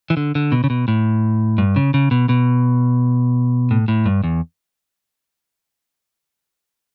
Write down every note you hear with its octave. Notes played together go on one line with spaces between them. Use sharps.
E3
D3
D3
B2
C#3
B2
A2
G2
C#3
C#3
B2
B2
A2
A2
G2
E2